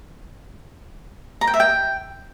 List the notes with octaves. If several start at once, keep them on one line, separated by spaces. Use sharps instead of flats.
A#5
G5
E5
G5